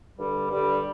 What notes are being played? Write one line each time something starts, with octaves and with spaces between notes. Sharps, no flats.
G2 D3 G3
G2 D3 G3